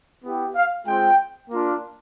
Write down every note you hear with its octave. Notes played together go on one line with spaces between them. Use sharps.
B3 E4 G4
F5
G#3 C4 F4 G5
A#3 D4 F4